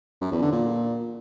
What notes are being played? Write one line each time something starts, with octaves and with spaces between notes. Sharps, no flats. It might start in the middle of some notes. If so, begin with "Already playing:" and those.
F#2
E2
D3
A#2